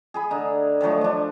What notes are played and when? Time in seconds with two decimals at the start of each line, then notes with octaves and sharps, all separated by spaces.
0.14 G#4 G#5 B5
0.31 D3 D#4
0.81 D#3 F3 F#3 A3
1.01 F3 D4